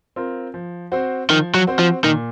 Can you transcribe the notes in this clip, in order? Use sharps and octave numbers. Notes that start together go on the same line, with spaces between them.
C4 F4 A#4
F3
C4 F#4 C5
D#3 F3
F#3
C4 F#4 C5
F3
A#2 D#3